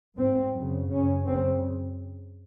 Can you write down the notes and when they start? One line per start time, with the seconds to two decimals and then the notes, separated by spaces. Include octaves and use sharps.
0.18 G#2 C4
0.54 F#2 C#3
0.90 F#2 C#3 C#4
1.26 F#2 C#3 C4